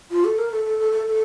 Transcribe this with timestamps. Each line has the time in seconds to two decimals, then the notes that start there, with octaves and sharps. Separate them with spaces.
0.11 F4
0.25 A4
0.39 A#4
0.52 A4
0.65 A4
0.79 A4
0.92 A4
1.07 A4